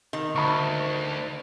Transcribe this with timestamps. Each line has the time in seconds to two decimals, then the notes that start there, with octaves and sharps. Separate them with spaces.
0.13 D#3
0.35 D2 B5 C#6